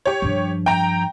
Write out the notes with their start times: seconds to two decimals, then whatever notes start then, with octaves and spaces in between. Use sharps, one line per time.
0.05 G4 C#5
0.22 G2 F3
0.66 G5 A#5